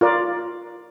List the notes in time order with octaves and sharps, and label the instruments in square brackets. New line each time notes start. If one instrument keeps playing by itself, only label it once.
[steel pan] F4 A#4 D5